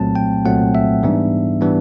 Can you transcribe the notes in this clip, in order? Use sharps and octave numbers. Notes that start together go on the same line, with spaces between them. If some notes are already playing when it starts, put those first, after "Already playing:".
Already playing: C2 A#2 F#3 A3 C4 A5
G5
C2 A#2 F#3 A3 C4 F#5
E5
G#2 E3 G3 B3 D4
E3 G3 B3 D4